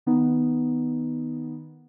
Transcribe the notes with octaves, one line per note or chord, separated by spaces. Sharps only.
D#3 B3 D#4